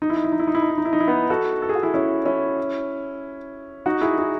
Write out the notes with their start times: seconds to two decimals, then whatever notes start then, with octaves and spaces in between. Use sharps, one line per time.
0.02 D#4
0.10 E4
0.17 D#4
0.24 E4
0.32 D#4
0.39 E4
0.48 D#4
0.55 E4
0.62 D#4
0.70 E4
0.78 D#4
0.85 E4
0.93 D#4
1.00 E4
1.08 B3 D#4
1.30 F#4 A4
1.62 A4
1.69 G#4
1.75 F#4
1.83 E4 G#4
1.94 C#4 E4
2.25 C#4 E4
3.86 D#4 F#4
4.01 E4 G#4
4.18 E4 G#4